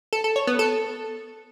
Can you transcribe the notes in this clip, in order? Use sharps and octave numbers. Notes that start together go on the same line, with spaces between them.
A4
A4
C#5
B3
A4